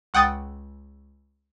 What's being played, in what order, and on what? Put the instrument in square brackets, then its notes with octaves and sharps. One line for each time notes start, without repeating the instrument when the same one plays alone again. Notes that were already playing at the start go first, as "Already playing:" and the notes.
[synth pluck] C#2 F#5 G5 D#6 A6